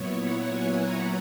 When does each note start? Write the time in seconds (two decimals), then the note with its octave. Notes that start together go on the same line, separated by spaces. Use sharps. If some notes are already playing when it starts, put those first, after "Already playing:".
Already playing: A#2 F#3 B3 E4 C#5
0.21 F#5
0.50 G#5
0.80 A#5